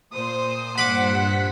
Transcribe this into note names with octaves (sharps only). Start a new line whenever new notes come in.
A#2 C5 D#6
G2 F#5 B5 D6 B6